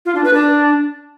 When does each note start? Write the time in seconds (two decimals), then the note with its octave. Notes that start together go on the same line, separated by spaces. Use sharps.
0.06 F4
0.15 D4
0.24 B4
0.34 D4